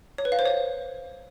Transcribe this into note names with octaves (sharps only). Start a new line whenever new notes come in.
C#5
B4
F5
C5
C#5